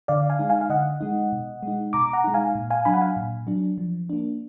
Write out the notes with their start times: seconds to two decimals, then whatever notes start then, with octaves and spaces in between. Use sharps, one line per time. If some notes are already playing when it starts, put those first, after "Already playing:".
0.08 D3 D5 F5
0.30 F5 G#5
0.39 G#3 D#4
0.50 F5 G#5
0.61 F5
0.70 D3 D#5 F#5
1.01 G#3 D#4
1.32 B2
1.63 G#3 D#4
1.93 B2 A#5 D6
2.13 F#5 A#5
2.24 G#3 D#4
2.34 F5 G#5
2.55 A#2
2.70 F5 G#5
2.85 F#3 D4 G#5 B5
2.94 F#5
3.01 F5 G#5
3.17 A#2
3.47 F#3 D4
3.78 F3
4.10 A#3 D4